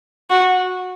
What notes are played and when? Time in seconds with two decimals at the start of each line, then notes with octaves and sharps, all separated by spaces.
0.30 F#4